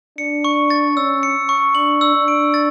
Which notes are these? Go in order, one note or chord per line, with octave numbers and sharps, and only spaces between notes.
D4 C#7
C#6
A6
C#4 E6
C#7
C#6
D4 F#7
E6
D4
D7
A6